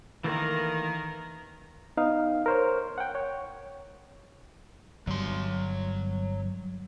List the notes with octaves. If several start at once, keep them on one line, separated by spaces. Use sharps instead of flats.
D#3 E3 A3 A#3 A#4
B3 D#4 F5
A#4 C5 C#5
F#5 G5
C#5
G1 F#3 G3 C6